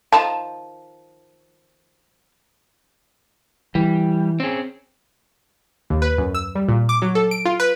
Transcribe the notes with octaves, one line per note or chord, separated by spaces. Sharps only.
D#3 F3 A5
E3 G3
C4 C#4 G#4
D#2
B4
F#2
E6
G3
A#2
D6
F#3
A4
D7
F4
B4